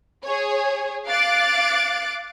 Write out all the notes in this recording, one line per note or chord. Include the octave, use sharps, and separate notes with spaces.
G#4 C#5
F5 D6 F#6 A6 D7